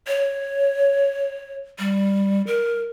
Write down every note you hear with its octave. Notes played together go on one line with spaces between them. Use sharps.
C#5
G3
A#4